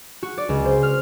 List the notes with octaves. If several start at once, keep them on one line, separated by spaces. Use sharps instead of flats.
F#4
D5
C#2
C5
F6